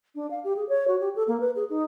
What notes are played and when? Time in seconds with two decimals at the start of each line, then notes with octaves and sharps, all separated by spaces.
0.15 D4
0.31 F5
0.44 G4
0.56 G#4
0.69 C#5
0.88 F#4
1.00 G4
1.16 A4
1.28 A#3
1.40 B4
1.56 G#4
1.70 D#4